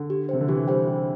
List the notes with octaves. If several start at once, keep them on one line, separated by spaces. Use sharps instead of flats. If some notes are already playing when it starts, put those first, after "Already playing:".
Already playing: D3
G4
C3 C5 G5
D3
E3 G4
G3 C5 G5
D4